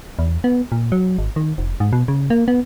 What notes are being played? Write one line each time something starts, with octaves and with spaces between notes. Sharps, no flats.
E2
B3
A#2
F#3
G#1
D#3
F1
G#2
B2
C#3
A#3
B3